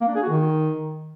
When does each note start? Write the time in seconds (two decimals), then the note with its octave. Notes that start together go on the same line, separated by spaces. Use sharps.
0.01 A#3
0.08 D4
0.15 G#4
0.22 F#4
0.29 D#3